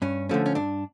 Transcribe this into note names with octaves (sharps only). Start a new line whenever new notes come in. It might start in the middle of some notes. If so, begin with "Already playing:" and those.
G2 C#4
D3 F3 A3 C#4
C#4
G2 D4